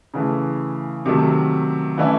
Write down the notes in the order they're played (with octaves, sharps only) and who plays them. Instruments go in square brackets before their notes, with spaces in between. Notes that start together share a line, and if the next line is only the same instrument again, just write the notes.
[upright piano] C#3 E3 A3
C3 D#3 F#3 A3
E3 A3 C#4 E4